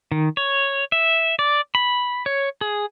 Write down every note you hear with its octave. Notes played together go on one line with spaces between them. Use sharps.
D#3
C#5
E5
D5
B5
C#5
G#4